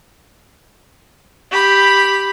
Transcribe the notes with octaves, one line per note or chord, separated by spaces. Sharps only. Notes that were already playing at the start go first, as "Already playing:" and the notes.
G4 B5